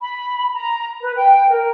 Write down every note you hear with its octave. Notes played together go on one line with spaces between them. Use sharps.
B5
A#5
B4
G5
A#4